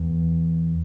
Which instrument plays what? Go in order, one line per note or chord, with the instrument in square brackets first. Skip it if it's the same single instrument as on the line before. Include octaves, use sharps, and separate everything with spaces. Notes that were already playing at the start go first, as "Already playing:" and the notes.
Already playing: [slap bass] E2